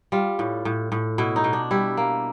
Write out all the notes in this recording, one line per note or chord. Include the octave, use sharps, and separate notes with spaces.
G3 F4
A2
A2
A2
B2 E4
D#4
B2
D4
G3 E4
A#3